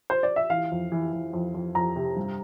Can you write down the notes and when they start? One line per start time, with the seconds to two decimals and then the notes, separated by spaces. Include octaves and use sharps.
0.10 C5
0.23 D5
0.36 E5
0.50 E3 F5
0.71 F2
0.92 E3
1.13 E3
1.33 F2
1.54 F2
1.75 F2 A#5
1.96 C3
2.16 G2